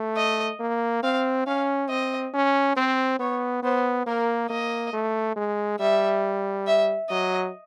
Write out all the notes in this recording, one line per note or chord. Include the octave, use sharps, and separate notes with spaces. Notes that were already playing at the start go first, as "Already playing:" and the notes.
Already playing: A3
D#5
A#3
C4 F5
C#4 F5
C4 D#5
C#4
C4 C5
B3 C#5
B3 C5
A#3 A#4
A#3 D#5
A3
G#3
G3 E5
E5
F#3 D#5